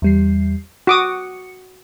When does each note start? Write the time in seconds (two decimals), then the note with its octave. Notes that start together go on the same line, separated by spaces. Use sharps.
0.02 E2 G3 C7
0.87 F#4 D6 D#6 C#7